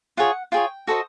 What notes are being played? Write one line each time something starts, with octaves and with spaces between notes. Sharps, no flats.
F4 G#4 C#5 F#5
F4 G#4 C#5 G5
F#4 A4 C5 D#5